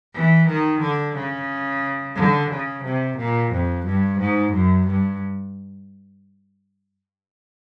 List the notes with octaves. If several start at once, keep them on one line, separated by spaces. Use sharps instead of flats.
E3
D#3
D3
C#3
D3
C#3
C3
A#2
F2
G2
G#2
F#2
G2